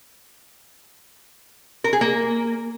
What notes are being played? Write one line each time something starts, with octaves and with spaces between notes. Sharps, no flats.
A#4
G#4
A#3